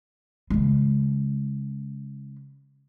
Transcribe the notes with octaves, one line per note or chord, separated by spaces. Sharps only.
C#3 G#3